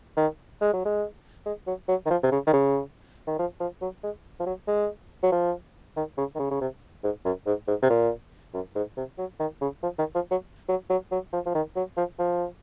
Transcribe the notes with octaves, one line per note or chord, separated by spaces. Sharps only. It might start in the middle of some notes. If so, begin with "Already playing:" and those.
D#3
G#3
F#3
G#3
G#3
F#3
F#3
D#3
F3
C3
C#3
D#3
C#3
D#3
F3
F3
F#3
G#3
F3
F#3
G#3
F#3
F3
D#3
C#3
D#3
C#3
C#3
C3
G#2
F#2
G#2
G#2
C3
A#2
F#2
G#2
C3
F#3
D#3
C#3
F3
D#3
F3
F#3
F#3
F#3
F#3
F3
F3
D#3
F#3
F3
F3